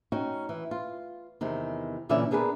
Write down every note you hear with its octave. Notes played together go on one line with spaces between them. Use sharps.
C#4 D#4 F#4 G5
E3
F4
E2 C3 D#3
A#2 D3 E3 C#4 D5 E5
B3 D4 G#4 A#4 B4